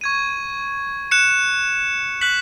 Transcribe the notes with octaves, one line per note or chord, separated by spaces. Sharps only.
C#6 G#6 D#7
F#6 C#7 E7
F#6 B6 F#7